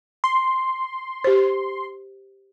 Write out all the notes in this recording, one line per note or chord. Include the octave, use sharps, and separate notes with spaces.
C6
G4 C5